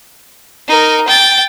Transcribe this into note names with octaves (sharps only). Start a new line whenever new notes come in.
D#4 A#4
G5 A6